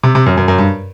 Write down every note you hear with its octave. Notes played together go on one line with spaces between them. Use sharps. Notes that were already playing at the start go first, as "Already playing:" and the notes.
C3
C3
F#2
F#2
F#2
G2